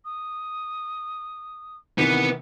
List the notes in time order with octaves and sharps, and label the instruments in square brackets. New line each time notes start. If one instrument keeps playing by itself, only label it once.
[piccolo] D#6
[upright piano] C3 D#3 E3 [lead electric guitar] B3 [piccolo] C#7